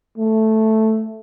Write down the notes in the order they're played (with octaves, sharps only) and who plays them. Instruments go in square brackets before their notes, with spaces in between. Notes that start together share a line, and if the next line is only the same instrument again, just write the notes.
[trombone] A3